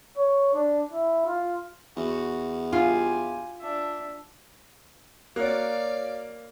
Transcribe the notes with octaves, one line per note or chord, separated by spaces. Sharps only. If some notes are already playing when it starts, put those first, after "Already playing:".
C#5
D4
E4
F4
E2 F#4
F4 G4 G#5
D4 E5
A#3 F#4 C#5 D5 F5